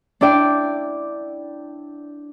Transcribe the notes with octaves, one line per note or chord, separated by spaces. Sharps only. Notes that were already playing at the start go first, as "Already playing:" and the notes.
D4 E4 D5 G5